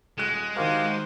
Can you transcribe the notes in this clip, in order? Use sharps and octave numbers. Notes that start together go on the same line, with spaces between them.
D#1 G#3 F#6
D#3 F#4 G4 A#4 C5 F5